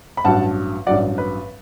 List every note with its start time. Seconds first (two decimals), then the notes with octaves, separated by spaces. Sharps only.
0.17 B5
0.24 A1 G2 F#3 F#5 A5
0.87 A1 G2 F#3 D5 F#5
1.18 B4